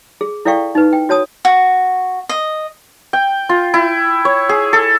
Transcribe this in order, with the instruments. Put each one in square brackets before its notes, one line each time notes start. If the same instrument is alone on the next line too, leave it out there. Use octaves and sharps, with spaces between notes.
[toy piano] G#4
E4 A4 D5 F5 G5 C#6
D#4 B4
G5
F#4 C#5 A5 D#6
[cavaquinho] F#4
D#5
[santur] G5
F4
E4
C#5
G#4
A4